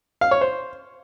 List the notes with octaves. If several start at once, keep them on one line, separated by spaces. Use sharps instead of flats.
F5
C#5
C5